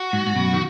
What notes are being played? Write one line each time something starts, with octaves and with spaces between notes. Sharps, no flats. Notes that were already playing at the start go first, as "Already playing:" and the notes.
Already playing: F#4
G#2
G#2
F#2 B2
D#3